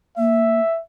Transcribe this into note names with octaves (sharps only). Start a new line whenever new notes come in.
A#3 E5